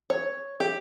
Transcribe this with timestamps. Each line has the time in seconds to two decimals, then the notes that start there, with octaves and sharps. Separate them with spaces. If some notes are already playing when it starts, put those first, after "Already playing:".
0.10 C#5
0.60 G4